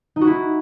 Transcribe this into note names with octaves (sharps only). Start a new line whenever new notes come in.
D#4
F#4
E4